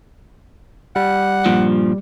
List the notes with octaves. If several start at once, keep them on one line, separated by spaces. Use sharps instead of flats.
G3 F#5
G2 A#2 F3